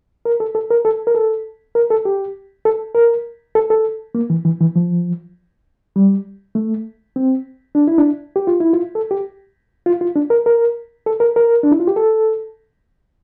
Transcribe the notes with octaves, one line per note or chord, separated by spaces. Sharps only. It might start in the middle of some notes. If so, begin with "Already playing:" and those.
A#4
A4
A4
A#4
A4
A#4
A4
A#4
A4
G4
A4
A#4
A4
A4
A#3
E3
E3
E3
F3
G3
A3
C4
D4
E4
D4
G4
F4
E4
F4
A4
G4
F4
F4
D4
A#4
A#4
A4
A#4
A#4
D4
E4
F4
G4
A4